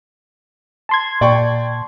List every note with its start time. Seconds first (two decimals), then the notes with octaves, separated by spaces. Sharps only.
0.89 A5 C6 G#6
1.21 A#2 D5 G5 C#6